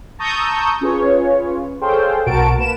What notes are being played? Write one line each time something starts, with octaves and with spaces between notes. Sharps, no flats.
A5 A#5 C#6 D#6 E6 G6
C#4 F4 G#4 B4 C#5
G#4 A4 C5 C#5 F5 G5
B1 B2 F#4 A#4 A5 D7
A#3 B4 E7